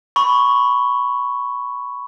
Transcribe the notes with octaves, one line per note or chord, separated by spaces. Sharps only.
B5 C#6